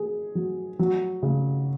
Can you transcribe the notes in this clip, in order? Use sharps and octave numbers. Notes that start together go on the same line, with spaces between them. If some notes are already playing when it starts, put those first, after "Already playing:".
Already playing: G#4
F#3
F#3
C#3